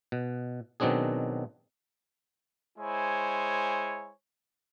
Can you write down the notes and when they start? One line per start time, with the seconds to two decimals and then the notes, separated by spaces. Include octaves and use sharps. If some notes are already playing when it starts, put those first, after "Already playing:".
0.12 B2
0.80 B2 D#3 F#3 C4 D4 G#4
2.79 G#3 E4 C5 C#5 G#5